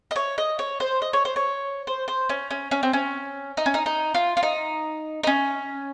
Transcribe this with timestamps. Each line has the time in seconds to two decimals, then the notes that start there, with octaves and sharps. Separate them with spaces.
0.11 D#5
0.16 C#5
0.38 D#5
0.59 C#5
0.80 C5
1.02 D#5
1.13 C#5
1.25 C5
1.36 C#5
1.87 C5
2.08 C5
2.29 C#4
2.51 C#4
2.71 C#4
2.83 C4
2.93 C#4
3.57 D#4
3.66 C#4
3.74 D#4
3.86 D#4
4.15 F4
4.37 F4
4.43 D#4
5.23 D#4
5.27 C#4